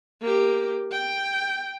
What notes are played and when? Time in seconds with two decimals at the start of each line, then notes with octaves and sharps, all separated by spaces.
0.22 A#3 G4
0.92 G5